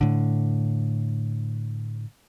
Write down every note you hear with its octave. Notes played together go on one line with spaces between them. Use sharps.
A2 D3